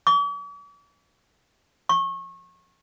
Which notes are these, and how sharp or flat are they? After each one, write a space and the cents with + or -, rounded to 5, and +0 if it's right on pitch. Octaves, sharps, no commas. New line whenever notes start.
D6 -45
C#6 -30